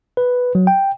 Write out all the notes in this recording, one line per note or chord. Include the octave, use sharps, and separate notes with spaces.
B4
F#3
G5